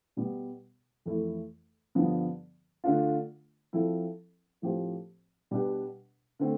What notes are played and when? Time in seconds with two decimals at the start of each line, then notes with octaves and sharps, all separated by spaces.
0.17 B2 G3 B3
1.06 F2 E3 A3 E4
1.95 G2 D3 F3 B3
2.84 D3 A3 D4 F4
3.73 F3 C4 E4 A4
4.62 A2 F3 C4 G4 C5
5.51 B2 G3 D4 G4 B4
6.39 D3 A3 C4